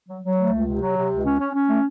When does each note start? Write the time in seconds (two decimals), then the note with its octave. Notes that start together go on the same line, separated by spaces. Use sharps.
0.09 F#3
0.24 F#3
0.37 A3
0.53 C#2
0.67 C3
0.81 F#3
0.97 C3
1.11 C#2
1.26 C#4
1.39 C#4
1.55 C#4
1.69 A3